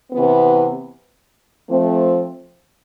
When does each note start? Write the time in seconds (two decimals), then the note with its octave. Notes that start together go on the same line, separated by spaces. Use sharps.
0.12 C3 E3 B3
1.69 F3 A3 C4